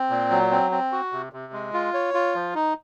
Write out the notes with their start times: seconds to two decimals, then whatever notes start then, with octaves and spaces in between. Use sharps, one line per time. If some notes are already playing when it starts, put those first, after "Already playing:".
Already playing: C4
0.10 A#2
0.31 F#3
0.51 C4
0.71 C4
0.92 F#4
1.12 C3
1.33 C3
1.53 G#3
1.74 F4
1.94 C#5
2.14 F4
2.35 F3
2.55 D#4